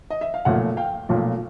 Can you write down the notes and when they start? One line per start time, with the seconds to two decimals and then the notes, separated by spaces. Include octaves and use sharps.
0.10 D#5
0.21 E5
0.34 F5
0.45 B1 A#2 F3 A3 E5 F#5
0.77 F5 G5
1.09 B1 A#2 F3 A3